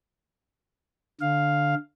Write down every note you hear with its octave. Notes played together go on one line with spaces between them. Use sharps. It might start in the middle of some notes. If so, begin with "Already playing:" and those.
D3 F5